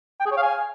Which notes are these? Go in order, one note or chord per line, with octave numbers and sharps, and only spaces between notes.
G5
G#4
C#5
F5
G#5